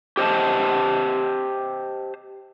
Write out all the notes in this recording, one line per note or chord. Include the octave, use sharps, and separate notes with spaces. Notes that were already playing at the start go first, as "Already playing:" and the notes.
G4 C5 D#5 A5